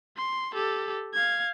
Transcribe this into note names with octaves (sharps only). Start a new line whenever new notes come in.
C6
G4 A4
F5 G#6